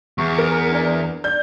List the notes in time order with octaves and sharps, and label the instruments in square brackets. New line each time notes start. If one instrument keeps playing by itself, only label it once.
[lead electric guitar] E2 [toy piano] C#6
[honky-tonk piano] A#4
[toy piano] D4 D5
[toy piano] D5 [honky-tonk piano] G6